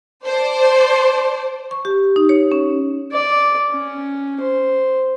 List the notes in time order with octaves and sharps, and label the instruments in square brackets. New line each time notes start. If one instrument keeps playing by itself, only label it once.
[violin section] C5 D5 A5
[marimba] C#6
G4
D#4
C#5
C#4
[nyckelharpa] D5
C#4
C5